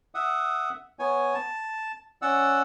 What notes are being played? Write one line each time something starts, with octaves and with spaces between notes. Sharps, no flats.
E5 F#5 D#6
B3 C#5 G#5
A5
C#4 D5 F#5 E6